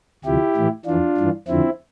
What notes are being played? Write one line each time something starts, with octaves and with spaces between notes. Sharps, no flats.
D2 C3 F3 E4 G4
A2 E3
F2 E3 D4 F4
G2 E3
F2 D3 F3 C4 E4